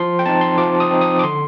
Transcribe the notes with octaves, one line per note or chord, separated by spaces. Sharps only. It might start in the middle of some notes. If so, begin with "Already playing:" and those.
Already playing: F3 C6
G5
C4 D#4 A5
C6
F3 D6
D#6
C4 D#4
D#6
D6
D3 C6